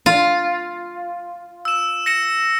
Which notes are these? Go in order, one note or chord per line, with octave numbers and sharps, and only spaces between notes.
F4
E6 E7
A#6 C#7 E7